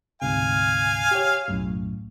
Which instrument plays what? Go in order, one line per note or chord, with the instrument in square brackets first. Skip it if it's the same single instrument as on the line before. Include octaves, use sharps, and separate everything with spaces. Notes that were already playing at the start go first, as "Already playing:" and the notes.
[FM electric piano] D2 G#2 C3 [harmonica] F5 G#5
[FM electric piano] G4 C#5
B1 F#2 A2